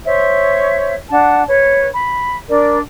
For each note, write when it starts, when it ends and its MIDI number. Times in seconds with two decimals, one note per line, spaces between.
0.05 0.95 72
0.05 0.95 73
0.05 0.95 76
1.10 1.42 62
1.10 1.42 78
1.10 1.42 81
1.47 1.86 71
1.47 1.86 73
1.94 2.37 83
2.48 2.78 62
2.48 2.78 70
2.48 2.78 74